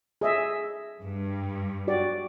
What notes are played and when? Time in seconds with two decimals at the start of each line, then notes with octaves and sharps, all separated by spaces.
0.21 G#4 D#5 E5
1.01 G2
1.88 F#4 G4 D5